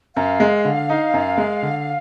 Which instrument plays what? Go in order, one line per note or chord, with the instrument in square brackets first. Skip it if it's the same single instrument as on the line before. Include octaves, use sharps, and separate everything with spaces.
[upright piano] F#2 [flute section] F5
[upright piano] G#3
D3
D#4
F#2
G#3
D3